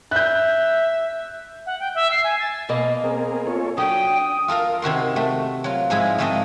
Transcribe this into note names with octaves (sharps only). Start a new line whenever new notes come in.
E5 F#6 G6
F#5
G5
E5
C7
G#5
A6
B2 A#3 D#5
C4 G#4 A#4
F4 A4 C#5
F#3 D4 G5 D#6
F4 A4 A#4 F5
C3 D#3 F#4 C6
A3 C4
F#3 F4
G#2 F3 G#3 E4 G#4
G#2 F3 G#3 A3 C4 D#5